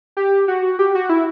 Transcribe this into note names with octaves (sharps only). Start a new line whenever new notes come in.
G4
F#4
G4
F#4
E4